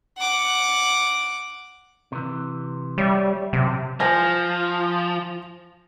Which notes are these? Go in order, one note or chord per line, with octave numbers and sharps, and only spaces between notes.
F#5 D6
C3 E3
G3 C#5 E5
C3 F#3
F3 C5 G#5 A#6